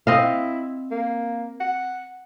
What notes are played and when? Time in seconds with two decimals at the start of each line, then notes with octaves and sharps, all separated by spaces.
0.07 C4 E4 D#5 F5
0.91 A#3
1.60 F#5